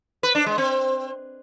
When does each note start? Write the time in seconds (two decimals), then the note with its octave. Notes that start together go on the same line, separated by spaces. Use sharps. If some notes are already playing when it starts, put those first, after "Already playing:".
0.23 B4
0.35 D4
0.46 G#3
0.58 C4